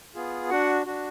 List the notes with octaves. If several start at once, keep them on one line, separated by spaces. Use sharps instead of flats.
B3 F4 G#4
D4 F#4 F#5
D4 F#4